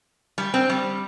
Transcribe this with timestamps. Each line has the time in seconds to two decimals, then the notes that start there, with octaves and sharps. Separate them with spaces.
0.38 G3
0.54 C4
0.70 G3